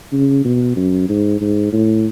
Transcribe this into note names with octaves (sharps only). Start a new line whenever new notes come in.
C#3
B2
F#2
G#2
G#2
A2